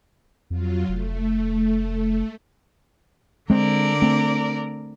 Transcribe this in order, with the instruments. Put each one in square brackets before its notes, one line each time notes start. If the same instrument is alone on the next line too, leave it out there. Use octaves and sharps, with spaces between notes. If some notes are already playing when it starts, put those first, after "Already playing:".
[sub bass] F2 [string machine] F#3 F4
[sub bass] F1 [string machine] A3
[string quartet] D3 A#4 D5 [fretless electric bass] G#3 C4
[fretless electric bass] A3 C4